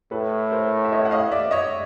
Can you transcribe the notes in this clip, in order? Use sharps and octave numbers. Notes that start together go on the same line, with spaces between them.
A2 A4 B4
A#4 C5
E5
C#5 D#5
F#5
D#5 F5
D5 E5
C#5 D#5